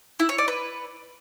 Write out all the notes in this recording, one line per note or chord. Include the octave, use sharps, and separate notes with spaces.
E4
C#5
D5
B4